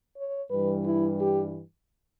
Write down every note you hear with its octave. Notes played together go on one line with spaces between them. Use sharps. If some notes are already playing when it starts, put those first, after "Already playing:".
C#5
G2 E3 G3 B4
E4
G4